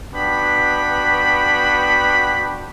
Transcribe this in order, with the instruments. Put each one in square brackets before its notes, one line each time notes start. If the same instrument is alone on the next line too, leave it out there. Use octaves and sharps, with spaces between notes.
[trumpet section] B3 D4 F#4 G5 B5